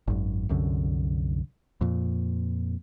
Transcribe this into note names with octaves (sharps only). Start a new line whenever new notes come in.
G#1 F#2
C2 F#2 D3
F2 A#2